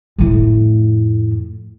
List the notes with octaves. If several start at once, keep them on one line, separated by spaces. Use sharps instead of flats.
F2 A2